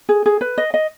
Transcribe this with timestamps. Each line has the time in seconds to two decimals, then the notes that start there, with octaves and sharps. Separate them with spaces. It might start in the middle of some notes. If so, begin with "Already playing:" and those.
0.09 G#4
0.26 G#4
0.41 B4
0.58 D#5
0.74 D#5